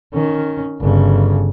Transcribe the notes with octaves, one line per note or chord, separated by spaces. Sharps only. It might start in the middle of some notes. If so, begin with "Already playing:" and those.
D#3 C#4
G1 C#3